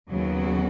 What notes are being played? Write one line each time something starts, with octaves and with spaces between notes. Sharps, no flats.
D#2 C#3 F#3 B3 F#4